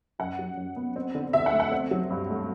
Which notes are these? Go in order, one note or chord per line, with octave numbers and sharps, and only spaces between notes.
F#2 F#5
F#3
F#2
B3
C4
D3
D2 E5
F#5
A3
F#5
C4
F#3
G2
A3